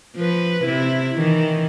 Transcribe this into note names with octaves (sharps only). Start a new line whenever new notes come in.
F3 B4
C3 E4
D#3 E3